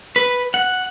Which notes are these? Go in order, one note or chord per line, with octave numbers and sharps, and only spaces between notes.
B4
F#5